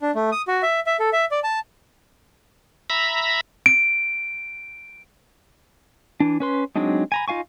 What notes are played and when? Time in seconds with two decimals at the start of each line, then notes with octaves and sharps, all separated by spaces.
0.02 D4
0.15 A3
0.32 D#6
0.48 F#4
0.63 E5
0.86 E5
0.99 A4
1.13 E5
1.31 D5
1.44 A5
2.90 E5 A#5 B5
3.66 D7
6.20 E3 D4
6.40 C#4 B4 C6
6.76 F#3 G#3 C4 D4 D#4
7.12 G#5 A#5 B5
7.28 D#4 F4 F5 G#5 C#6